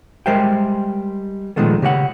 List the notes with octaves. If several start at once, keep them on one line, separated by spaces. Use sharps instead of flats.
G3 G#3 A#4 C5 E5 G5
A#2 D#3 F3 G#3 A3 B3
C#3 G4 D#5 F#5